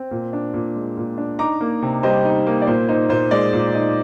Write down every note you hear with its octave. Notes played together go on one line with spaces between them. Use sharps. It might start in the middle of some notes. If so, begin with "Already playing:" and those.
Already playing: C4
A#2
D4
A#2
G#3
A#2
D4
D#4 A#5 D6
A#3
C3
G3 C5 D#5
D#4
A#3
D5
A#2 C5
D#4 C5
A#2 C5
G#3 D5
A#2
D#4